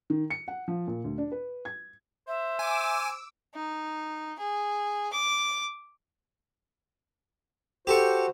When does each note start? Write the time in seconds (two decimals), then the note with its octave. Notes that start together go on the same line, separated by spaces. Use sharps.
0.10 D#3
0.30 C#7
0.48 F#5
0.68 F3
0.87 A#2
1.04 D2
1.18 D4
1.32 B4
1.65 G#6
2.28 C5 E5
2.59 G#5 D6 E6
3.54 D#4
4.39 G#4
5.13 D6
7.87 F#4 G4 A4 C5 C#6